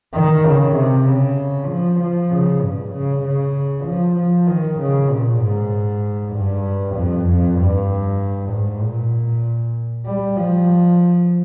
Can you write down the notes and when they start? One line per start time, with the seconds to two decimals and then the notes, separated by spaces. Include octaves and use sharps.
0.14 D#3
0.44 C#3
0.76 C3
1.06 C#3
1.69 F3
2.00 F3
2.31 C#3
2.61 G2
2.93 C#3
3.24 C#3
3.86 F3
4.16 F3
4.47 D#3
4.79 C#3
5.10 A#2
5.40 G#2
6.33 G2
6.95 F2
7.27 F2
7.58 G2
8.51 G#2
8.82 A#2
10.05 G3
10.36 F3